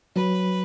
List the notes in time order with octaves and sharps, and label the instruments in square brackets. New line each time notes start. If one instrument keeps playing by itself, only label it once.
[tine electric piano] F#3 [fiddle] B4